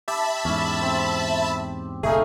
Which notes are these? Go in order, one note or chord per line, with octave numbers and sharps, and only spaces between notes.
G4 E5 A5 B5
E2 G#2 C#4
C4
F#1 B1 A3 D#4 G#4 F5